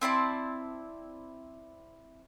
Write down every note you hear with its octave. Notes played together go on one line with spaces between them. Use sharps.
C4 E4 D5 A5